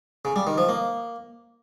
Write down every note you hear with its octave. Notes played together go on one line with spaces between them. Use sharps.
C#3
G3
D#3
F3
A#3